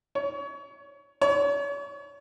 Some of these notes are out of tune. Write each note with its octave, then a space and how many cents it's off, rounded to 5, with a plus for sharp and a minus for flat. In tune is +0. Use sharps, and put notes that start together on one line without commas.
C#5 +30
C#5 +40